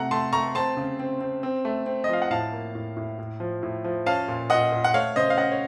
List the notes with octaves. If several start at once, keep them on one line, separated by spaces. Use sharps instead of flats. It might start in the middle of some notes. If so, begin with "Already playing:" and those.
Already playing: C3 A3 F#5 A#5
A3 A5 C6
A3 A#5 C#6
C4 A5 C6
C#3
C4
C4
C4
A3
C4
D#5
F3 F5
F#5
A2 F5 A5
A#3
A2
A2
A2
F3
A2
F3
C#4 F5 A5
A#2
A#2 D#5 F#5
A#2
F#5
A3 C#5 F5
C#3 C5 D#5
F5
C#4 D#5 F#5
C#5